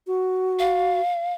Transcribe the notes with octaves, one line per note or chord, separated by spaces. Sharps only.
F#4
F5